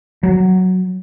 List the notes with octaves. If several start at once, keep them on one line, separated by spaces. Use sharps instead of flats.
F#3